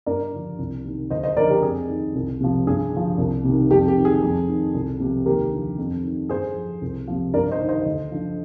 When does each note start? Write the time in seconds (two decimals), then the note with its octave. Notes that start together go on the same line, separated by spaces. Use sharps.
0.06 G2 A#4 D5
0.33 D3 F3
0.59 C2
0.85 C3 D#3
1.10 D2 C5 D#5
1.23 C5 D#5
1.37 D3 F3 A#4 D5
1.50 G4 A#4
1.62 F2 G#4
1.89 D#3
2.15 C2
2.40 C3 F3
2.67 G2 G#4
2.93 D3 F3
3.18 C2
3.44 C3 D#3
3.70 F2 G4
3.88 G4
3.96 D#3
4.05 G#4
4.22 F2
4.48 D#3
4.74 C2
5.00 C3 F3
5.26 D#2 G4 A#4
5.53 D3 F3
5.79 F2
6.04 D#3
6.29 G2 G#4 C5
6.56 F3
6.82 C2
7.08 C3 F3
7.34 G2 A#4 D5
7.51 C5 D#5
7.60 D#3
7.69 C5 D#5
7.86 D2
8.12 D3 F3